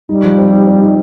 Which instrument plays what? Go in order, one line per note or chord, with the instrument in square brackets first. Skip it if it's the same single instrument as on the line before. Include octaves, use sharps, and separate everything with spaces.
[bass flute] G3 [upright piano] D#4
[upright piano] F3
C4
D#4
C4
D#4